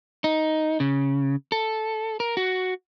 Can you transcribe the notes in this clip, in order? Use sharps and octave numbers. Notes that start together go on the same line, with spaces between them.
D#4
C#3
A4
A#4
F#4